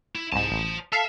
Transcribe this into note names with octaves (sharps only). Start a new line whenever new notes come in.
E4
C2 G#2 C5 A5
A1
A4 E5 F5